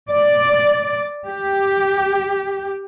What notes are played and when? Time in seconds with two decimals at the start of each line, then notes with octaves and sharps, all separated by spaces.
0.10 D5
1.27 G4